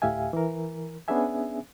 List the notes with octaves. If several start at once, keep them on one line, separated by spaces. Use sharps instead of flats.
D2 A2 G4 E5 F5 G#5
E3 A#4
B3 C#4 D4 G#4 E5 G#5